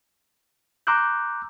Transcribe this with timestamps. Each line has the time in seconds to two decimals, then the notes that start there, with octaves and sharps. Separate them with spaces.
0.87 A#5 C6 D6 E6 F#6 G6